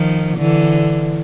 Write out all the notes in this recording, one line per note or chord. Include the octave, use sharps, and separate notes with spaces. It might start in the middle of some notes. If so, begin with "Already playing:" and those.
Already playing: D#3 F3
D3 E3